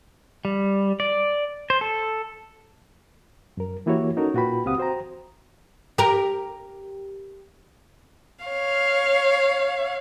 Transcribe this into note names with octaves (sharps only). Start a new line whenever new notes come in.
G3
D5
C5
A4
F#2 A#4
E3 A#3 E4 F#4 G4 C#5
C#4 D#4 F#4 A4 A#4 C#5
A#2 F4 F#4 B4 G5 B5
C#2 C4 G4 F5 F#5 D#6
F#4 C5 G5 A#5
G4 A#4
C#5 F5